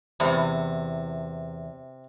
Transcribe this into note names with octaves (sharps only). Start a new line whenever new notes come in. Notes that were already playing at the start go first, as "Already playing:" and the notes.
E2 C3